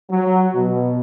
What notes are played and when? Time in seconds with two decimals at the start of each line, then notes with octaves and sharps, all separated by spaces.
0.11 F#3
0.55 B2